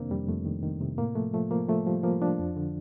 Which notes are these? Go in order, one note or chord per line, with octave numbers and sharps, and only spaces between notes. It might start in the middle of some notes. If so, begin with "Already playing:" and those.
Already playing: F2 C3 D#3 A#3 C4 D4
F2 G3
F2 A3
D#3
D#3
C3
A2 A#3
F3 A3
F3 A3
F3 A#3
F3 A3
F3 G3
F3 A#3
F3 D4
F2
D3